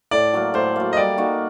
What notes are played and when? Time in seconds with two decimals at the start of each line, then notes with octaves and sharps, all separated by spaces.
0.11 A2 D5
0.34 F#3 A#3
0.54 A2 C5
0.76 F#3 A#3
0.93 D#5
0.97 G3 D5
1.18 A#3 D#4 F#4